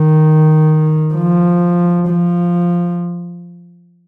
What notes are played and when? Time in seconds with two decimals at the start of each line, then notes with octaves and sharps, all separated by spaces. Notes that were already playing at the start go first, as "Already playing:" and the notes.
Already playing: D#3
1.14 F3
2.08 F3